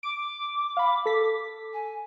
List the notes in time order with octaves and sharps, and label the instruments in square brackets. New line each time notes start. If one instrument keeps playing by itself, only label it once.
[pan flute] D6 [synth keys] D7
[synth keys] F5 B5
A4 B6
[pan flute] G#5